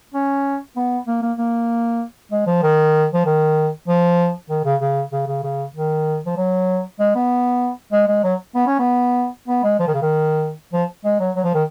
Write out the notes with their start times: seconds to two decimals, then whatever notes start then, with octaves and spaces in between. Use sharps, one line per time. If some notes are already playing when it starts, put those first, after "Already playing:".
0.14 C#4
0.76 B3
1.07 A#3
1.22 A#3
1.38 A#3
2.32 G#3
2.47 F3
2.63 D#3
3.14 F3
3.26 D#3
3.88 F3
4.50 D#3
4.65 C#3
4.81 C#3
5.12 C#3
5.27 C#3
5.43 C#3
5.75 D#3
6.26 F3
6.37 F#3
7.00 G#3
7.15 B3
7.92 G#3
8.08 G#3
8.23 F#3
8.55 B3
8.67 C#4
8.79 B3
9.48 B3
9.63 G#3
9.80 F3
9.88 D#3
9.94 C#3
10.02 D#3
10.73 F3
11.05 G#3
11.20 F#3
11.36 F#3
11.44 F3
11.54 D#3